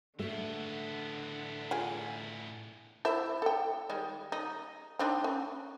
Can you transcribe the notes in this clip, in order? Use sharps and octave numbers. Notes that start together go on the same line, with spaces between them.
A2 D3 A3 B3
F4 G#4 G#5
E4 C5 E5
A4 G5
D#3 G3 G#3
D#4
C4 D4 D#4
C#4